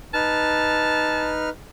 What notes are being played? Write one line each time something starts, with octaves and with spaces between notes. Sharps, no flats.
D#4 B4 A5 F6